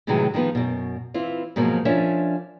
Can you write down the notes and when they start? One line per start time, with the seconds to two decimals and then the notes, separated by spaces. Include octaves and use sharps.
0.07 A2 C3 D#3 E3 F#3 G#3
0.34 D#3 F3 G3 B3 D#4
0.55 F#2 B2
1.14 E3 C4 E4 F4
1.56 G#2 B2 F3 F#3 A#3
1.85 F3 C#4 D4 A#4 C#5 E5